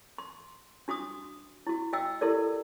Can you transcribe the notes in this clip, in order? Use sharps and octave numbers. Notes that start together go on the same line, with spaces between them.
C6
D4 F#4 C6 D6 D#6
E4 F#4
F#4 D#5 G5 E6
E4 G4 A4 A#4 D5